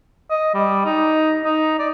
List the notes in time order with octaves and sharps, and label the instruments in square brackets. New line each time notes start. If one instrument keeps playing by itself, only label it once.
[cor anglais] D#5
G3
D#4
D#4
D5